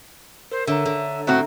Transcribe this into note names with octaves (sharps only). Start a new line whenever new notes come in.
A#4 C5
D3 A4 C#5 E5 A#5
D3
A2 C4 F#4 E5 A#5 F#6